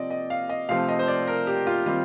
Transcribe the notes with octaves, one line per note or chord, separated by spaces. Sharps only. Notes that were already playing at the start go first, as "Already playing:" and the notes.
Already playing: C3 F3 C4 D5 D#5
D#5
F5
D#5
C3 F3 A3 C4 F5
D#5
C5
D5
A#4
G4
F4
D#3 G3 C4 F4